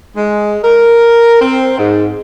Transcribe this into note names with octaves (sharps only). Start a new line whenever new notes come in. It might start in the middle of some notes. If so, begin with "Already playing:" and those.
G#3
A#4
C4
G#2